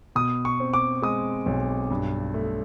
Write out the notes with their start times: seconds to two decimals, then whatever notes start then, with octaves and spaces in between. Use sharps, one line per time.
0.15 B2 D#6
0.45 C#6
0.60 C4
0.74 D6
1.02 G#3 D#6
1.46 B1
1.91 G2
2.34 A3